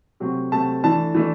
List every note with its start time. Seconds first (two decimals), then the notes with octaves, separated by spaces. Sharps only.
0.20 C3 F#3 A3 C4
0.52 C3 F#3 A3 C4 A5
0.83 E3 A3 D4 A5
1.15 E3 A3 D4